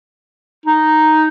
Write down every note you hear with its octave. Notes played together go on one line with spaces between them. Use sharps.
D#4